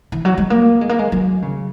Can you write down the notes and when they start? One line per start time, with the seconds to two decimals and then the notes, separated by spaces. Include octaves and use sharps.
0.12 E3
0.25 F#3
0.38 G#3
0.50 A#3
0.81 G#3
0.89 A#3
0.99 G#3
1.12 F#3
1.42 C#3